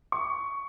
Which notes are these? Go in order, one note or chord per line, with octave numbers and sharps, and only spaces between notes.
C#6